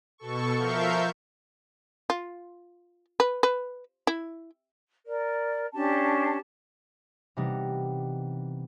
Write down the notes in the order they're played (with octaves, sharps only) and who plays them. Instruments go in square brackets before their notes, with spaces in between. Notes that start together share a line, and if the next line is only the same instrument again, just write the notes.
[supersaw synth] B2 A4 C#6
F3 A#4 E5 F5 C#6 G6
[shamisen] F4
B4
B4
E4
[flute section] A#4 D5
C#4 D4 G4 A5
[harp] C3 E3 G3 B3 D#4